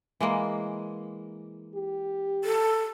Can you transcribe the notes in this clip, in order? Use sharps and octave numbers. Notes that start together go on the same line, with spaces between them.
E3 G#3 A#3
G4
A4